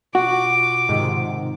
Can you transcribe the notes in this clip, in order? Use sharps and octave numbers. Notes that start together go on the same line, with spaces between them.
B2 F4 F#4 F#5 D6
G#2 C3 D#3